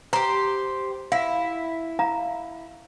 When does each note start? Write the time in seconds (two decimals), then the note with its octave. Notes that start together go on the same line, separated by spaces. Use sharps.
0.13 G4 C5 A#5
1.12 E4 F5
1.99 F5 A#5